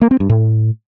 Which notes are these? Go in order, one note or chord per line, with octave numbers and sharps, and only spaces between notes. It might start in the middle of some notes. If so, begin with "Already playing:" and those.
A#3
C4
G2
A2